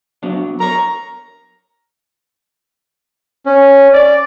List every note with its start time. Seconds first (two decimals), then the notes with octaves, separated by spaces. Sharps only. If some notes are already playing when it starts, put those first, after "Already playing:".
0.23 F#3 B3 D4
0.60 A#4 C#5 A#5
3.46 C#4
3.93 D5